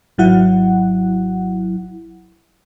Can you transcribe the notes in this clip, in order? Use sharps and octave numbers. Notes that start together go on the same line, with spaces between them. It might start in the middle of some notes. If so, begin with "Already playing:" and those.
G#1 F#3 E4 F#5